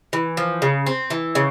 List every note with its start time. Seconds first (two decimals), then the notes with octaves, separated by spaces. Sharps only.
0.13 E3
0.37 F3
0.62 C#3
0.86 C4
1.10 E3
1.35 C#3